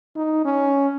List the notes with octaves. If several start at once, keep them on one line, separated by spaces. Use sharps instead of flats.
D#4
C#4